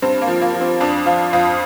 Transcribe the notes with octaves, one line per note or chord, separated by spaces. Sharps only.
G2 C4
A#3
F3
A#3
F3
C4
F2 D4
F3 F4
F2 F4